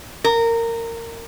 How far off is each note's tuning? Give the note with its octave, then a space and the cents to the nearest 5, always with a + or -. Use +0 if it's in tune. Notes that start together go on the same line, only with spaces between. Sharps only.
A#4 -20